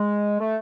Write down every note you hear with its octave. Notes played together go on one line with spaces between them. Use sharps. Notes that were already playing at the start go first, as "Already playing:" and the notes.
Already playing: G#3
A3